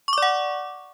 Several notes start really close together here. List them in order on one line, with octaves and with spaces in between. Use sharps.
C#6 D6 D5 F#5